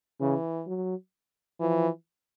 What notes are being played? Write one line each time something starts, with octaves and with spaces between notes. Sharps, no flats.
C#3 E3
F#3
E3 F3